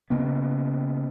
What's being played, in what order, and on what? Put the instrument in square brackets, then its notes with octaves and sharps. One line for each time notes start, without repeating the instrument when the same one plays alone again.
[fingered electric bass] C#3 A#3 B3